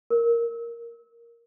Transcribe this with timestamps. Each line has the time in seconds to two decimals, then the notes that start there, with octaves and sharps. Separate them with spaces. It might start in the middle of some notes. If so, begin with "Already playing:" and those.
0.10 A#4